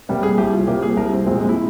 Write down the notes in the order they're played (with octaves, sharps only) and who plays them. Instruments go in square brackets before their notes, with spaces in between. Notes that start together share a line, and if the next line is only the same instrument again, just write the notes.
[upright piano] C3 G3 A#3
[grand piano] G#4
[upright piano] C2 [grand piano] G4
[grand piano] F4
[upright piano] C3 G3 A#3 [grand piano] G4
[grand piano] G#4
[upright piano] C2 [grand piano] A#4
[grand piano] C4
[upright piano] A#2 F3 G#3 C4 [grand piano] A#3
[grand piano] G#3
E4